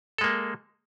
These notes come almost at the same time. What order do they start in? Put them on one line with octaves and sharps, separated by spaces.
A4 G#3 A#3